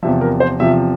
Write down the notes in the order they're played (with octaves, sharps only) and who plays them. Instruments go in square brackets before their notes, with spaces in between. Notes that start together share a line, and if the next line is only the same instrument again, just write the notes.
[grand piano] E2 C3 F3 E5
A#4
C5
E2 C3 F3 E5